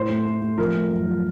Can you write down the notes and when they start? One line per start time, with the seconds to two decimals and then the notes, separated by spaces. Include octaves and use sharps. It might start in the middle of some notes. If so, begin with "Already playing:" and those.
Already playing: A2 C5
0.09 A3
0.26 A3
0.42 A3
0.58 F3 A#4
0.74 A3
0.90 F#2
1.06 F3